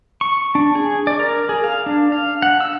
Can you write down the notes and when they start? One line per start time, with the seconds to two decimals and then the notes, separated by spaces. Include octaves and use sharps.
0.21 C#6
0.55 D4
0.75 G#4
1.07 D5
1.20 A#4
1.49 G#4
1.64 F5
1.86 D4
2.12 F5
2.42 F#5
2.61 E6